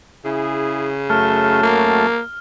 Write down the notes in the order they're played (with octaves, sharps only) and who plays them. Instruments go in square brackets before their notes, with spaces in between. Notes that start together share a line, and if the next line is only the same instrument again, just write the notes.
[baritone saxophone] C#3 [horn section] E4 G#4
[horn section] F#2 F#3 F#4 [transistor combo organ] A3 [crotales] F6
[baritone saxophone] A#3